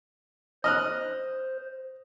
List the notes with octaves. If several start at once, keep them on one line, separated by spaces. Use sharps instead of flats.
C5 D#5 F6 F#6